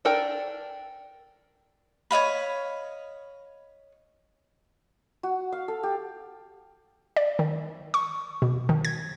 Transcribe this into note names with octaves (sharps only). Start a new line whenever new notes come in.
D4 A4 A#4 G5
C#5 D#5 F5 B5
F#4
F5
A4
G4
D5
D#3
C#6
B2
D#3
G#6